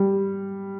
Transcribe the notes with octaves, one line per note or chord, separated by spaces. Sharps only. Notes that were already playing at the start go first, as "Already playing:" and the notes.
Already playing: G3